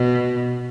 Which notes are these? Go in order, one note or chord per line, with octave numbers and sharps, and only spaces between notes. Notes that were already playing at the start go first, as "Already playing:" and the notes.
Already playing: B2